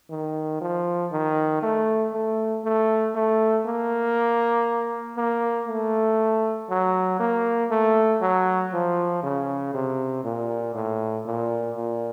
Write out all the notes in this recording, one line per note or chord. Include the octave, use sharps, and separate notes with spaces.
D#3
F3
D#3
A3
A3
A3
A3
A#3
A#3
A3
F#3
A#3
A3
F#3
F3
C#3
C3
A#2
A2
A#2
A#2